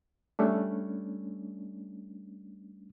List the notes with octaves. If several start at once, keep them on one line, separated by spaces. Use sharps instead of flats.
G3 A3 C#4 D4